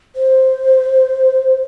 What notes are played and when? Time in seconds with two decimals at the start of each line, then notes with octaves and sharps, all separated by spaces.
0.16 C5